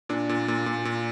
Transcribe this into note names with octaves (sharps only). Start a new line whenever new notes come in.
A#2 D4
A#2
A#2
A#2
A#2